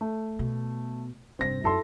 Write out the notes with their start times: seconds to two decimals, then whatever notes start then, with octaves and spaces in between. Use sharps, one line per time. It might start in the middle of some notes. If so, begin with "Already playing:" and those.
0.01 A3
0.39 B2
1.39 F1 G2 C4 A#6
1.64 F#2 D#4 E4 A4 C6